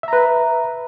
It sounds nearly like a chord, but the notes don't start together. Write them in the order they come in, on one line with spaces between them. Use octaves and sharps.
E5 A#5 B4